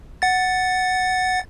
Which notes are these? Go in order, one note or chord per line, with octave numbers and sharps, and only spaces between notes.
F#5 A6